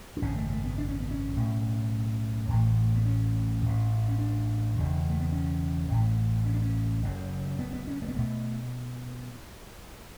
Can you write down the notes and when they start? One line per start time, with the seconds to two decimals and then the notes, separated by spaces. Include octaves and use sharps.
0.17 D4
0.22 G#1 F#2 C#3 C#4
0.36 A3
0.50 A3
0.64 B3
0.78 D4
0.89 C#4
1.00 B3
1.11 C#4
1.35 B1 A2
2.48 A1 A2
2.96 B3
3.05 C#4
3.62 A1 A2
4.08 C#4
4.18 D4
4.76 E1 E2 C#3
5.10 A3
5.20 B3
5.32 C#4
5.89 A1 A2
6.46 C#4
6.54 D4
6.62 C#4
7.02 F#1 F#2 C#3
7.59 B3
7.73 B3
7.87 C#4
8.02 A3
8.08 B3
8.16 B2 A3